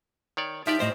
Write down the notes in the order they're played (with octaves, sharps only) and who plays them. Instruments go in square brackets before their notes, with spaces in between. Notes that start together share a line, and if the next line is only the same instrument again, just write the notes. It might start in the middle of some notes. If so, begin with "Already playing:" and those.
[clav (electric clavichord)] D#3 C#5 D5
[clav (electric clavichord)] F3 G4 D5 [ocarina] D#4 [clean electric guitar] E5
[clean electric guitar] A2 C5 [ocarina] D#5